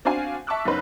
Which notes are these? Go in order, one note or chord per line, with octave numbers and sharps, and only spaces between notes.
C4 D4 F#4 F5 G#5
E5 A5 C#6 D6 E6 F#6
F#1 C#4 D#4 B4 C5